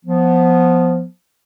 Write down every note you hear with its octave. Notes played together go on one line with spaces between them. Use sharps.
F3 B3